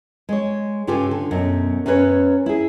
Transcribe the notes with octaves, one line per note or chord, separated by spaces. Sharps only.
G#3 C#5
G2 C#3 F4 G4 A4 G#5
D3
F#2 B2
F#2 F#3 C#4 B4 C#5
E4 G#4